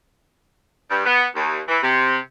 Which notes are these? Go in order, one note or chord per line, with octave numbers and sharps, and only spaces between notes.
G2
B3
D#2
E3
C3